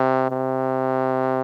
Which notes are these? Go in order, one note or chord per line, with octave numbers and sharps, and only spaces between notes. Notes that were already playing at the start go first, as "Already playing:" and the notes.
Already playing: C3
C3